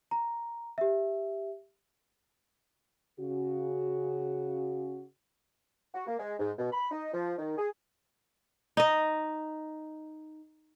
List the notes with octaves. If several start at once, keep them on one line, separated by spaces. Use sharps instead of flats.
A#5
G4 E5
C#3 F#4
F#4
A#3
G#3
G#2
B2
B5
D#4
F3
D#3
G#4
D#4 D#5